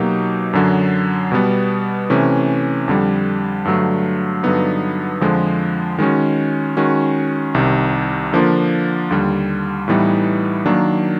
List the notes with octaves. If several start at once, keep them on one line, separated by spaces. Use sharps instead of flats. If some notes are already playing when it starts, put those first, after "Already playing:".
Already playing: B2 F#3 A#3 D#4 G4
F#2 D3 F#3
B2 G3 B3
C3 E3 A3 C#4
F2 D3 G3
G2 D3 F#3 A3
G2 D3 F#3 B3 D#4
F2 D3 F3 G#3
D#3 G#3 C#4 F#4
D#3 G#3 C#4 F#4
C2 C3 D#3
D3 F3 A#3 D4 F4
D#2 D3 G3
A2 E3 G3 B3 D#4
D#3 F#3 A#3 D4